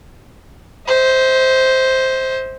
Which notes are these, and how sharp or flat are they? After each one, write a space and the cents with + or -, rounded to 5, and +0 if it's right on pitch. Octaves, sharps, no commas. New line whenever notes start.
C5 +0 E5 -45